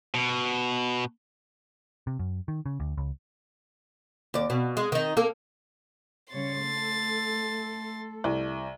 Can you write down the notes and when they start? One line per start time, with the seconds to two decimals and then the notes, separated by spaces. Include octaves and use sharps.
0.14 B2
2.07 C3
2.19 F#2
2.48 D#3
2.66 C#3
2.80 D2
2.97 C#2
4.34 D#2 D5
4.50 B2
4.77 G#3
4.92 D#3 D#4
5.17 A#3 A4
6.34 C#3 G3 C#5 C6 A6
6.66 A3 A4
8.24 C2